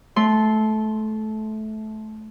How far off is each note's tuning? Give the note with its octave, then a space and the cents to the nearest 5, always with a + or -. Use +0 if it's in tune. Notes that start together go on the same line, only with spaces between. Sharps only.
A3 -20 C6 +0